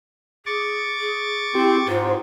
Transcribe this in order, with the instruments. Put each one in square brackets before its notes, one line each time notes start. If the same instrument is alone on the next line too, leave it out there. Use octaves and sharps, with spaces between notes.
[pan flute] G#4 [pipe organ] C#6 D6 A6
[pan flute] G#4
[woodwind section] C4 [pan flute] E4 [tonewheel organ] G4
[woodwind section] G#2 [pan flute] F4 [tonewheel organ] C5